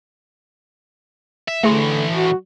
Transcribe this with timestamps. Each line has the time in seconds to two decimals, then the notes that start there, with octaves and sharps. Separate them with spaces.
1.48 E5
1.63 A2 D3 E3 A3 G#4 C6
2.13 F#4